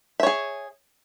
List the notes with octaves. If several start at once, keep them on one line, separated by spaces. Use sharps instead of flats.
G#4 C#5 E5